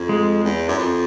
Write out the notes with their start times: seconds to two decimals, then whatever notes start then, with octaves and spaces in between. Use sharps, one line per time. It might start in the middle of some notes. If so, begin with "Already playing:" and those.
Already playing: F2
0.09 G#3
0.44 E2
0.68 F#2
0.79 F2